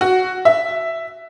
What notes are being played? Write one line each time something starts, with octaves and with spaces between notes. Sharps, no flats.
F#4
E5